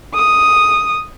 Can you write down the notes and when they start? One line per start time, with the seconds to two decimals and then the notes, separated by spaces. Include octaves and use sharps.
0.15 D#6